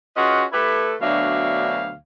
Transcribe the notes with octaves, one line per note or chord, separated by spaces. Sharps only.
C#4 F4 F#4 G#4 B4 D#5
A3 E4 G4 A4 B4
D2 B2 F#3 D4 E5 F5